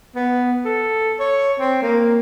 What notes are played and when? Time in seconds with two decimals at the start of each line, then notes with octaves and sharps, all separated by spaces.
0.15 B3
0.65 A4
1.19 C#5
1.60 C4
1.82 A#3